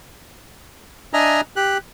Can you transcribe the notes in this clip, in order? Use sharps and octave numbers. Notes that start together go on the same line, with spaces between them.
D4 D#5 E5 G#5 A#5
G4 F#6